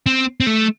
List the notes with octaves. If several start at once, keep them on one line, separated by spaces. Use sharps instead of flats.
C4
C4
A3